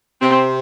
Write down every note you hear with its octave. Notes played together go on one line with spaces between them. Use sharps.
C3 C4